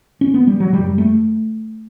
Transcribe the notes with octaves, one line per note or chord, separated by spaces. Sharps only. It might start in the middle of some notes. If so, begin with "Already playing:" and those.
C#4
B3
G3
F#3
F#2 C#3 G3
A3